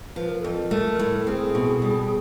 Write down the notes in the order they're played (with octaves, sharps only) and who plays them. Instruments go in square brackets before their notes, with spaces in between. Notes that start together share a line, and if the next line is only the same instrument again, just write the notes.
[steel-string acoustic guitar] F3 [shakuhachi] B4
[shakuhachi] A#4
[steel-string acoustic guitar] F2 [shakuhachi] A4
[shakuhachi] A#4
[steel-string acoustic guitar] A3
A2
[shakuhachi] A4
[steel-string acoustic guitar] C4 [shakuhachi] G#4
[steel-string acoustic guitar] B2
G3